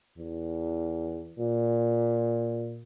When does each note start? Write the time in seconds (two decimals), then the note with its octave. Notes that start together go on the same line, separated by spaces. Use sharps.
0.18 E2
1.39 A#2